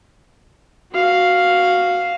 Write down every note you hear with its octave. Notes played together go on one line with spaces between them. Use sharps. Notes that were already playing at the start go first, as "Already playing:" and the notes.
F#4 F5